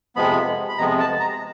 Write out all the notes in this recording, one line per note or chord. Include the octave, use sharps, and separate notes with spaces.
F2 C3 F3 G#3 B3 B5
B5
F2 C3 F3 G#3 B3 A#5
A5
A#5